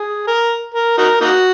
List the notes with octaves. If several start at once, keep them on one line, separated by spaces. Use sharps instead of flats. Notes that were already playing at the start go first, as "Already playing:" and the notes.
Already playing: G#4
A#4
A#4
D#4 F#4 A#4
A#3 D#4 F#4